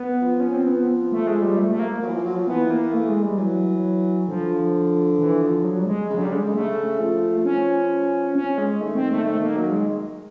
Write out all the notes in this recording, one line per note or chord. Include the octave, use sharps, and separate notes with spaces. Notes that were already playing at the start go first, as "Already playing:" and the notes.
Already playing: B3
F3
C#4
C4
B3
A3
G#3
G3
A3
A3
A#3
F#3
E3
F3
F#3
F3
E3 B3
A#3
A3
G#3
G3
E3 F#3
D3 F3
E3
F3
F#3
G3
G#3
C#3
D3 F#3
C#3 G3
D3 G#3
C#3
D3
C#3 A3
F3
C#4
C#4
G#3
D#3 A3
C4
A3
A3
A#3
F#3
G#3